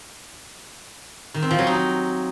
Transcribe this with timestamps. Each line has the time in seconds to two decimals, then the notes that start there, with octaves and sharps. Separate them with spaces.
1.34 D#3
1.43 C4
1.51 F3
1.59 F#3
1.67 D#4